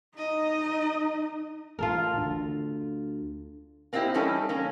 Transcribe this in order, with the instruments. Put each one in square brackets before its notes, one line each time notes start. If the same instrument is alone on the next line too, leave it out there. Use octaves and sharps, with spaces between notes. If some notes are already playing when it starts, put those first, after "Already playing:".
[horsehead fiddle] D#4 [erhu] D#5
[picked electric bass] A1 [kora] F4 A4 A#4
[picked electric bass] D2 D3
[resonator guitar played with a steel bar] A#3 C4 D#4 E4 G4
E3 G3 C#4 D#4 A4
A#3 C#4